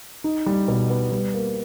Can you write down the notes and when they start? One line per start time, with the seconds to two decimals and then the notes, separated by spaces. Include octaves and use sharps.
0.24 D#4
0.46 G3
0.68 B2
0.90 B3
1.12 G3
1.34 A#3